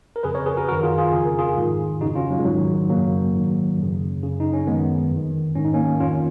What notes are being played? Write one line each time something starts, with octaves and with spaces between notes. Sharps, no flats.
A#4
F2 C#3 G#4 B4
A#4 C#5
G#4 B4
F#4 A#4
F#2 D#3 F#4 A#4
F4 G#4
F4 G#4
F2 C#3 G#4
A#4
F4 G#4
G#2 D#3
F2 C#3 D#4 F#4
C#4 F4
F#3
G#3
G#2 D#3 F#3
F#2 C#3 F#3 A#3
G#2 D#3
F#2 C#3
F#2 C#3
D#4
C#4
F#2 D#3 G#3 B3
F2 D#3
G#2 D#3 C#4
D#4
A#3 C#4
F2 D#3 C#4 F4